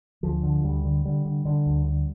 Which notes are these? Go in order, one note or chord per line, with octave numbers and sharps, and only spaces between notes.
D2 F3
D3
D2 G3
D3
D3 G3
D3
D3
D2
D3